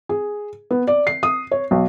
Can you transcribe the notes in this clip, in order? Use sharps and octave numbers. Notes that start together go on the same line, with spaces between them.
G#4
B3
D5
C7
D#6
C#5
B1